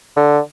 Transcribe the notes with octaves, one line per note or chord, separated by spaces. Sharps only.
D3